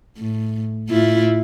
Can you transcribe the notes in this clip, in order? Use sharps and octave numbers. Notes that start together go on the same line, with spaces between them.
A2
A2 E4 F4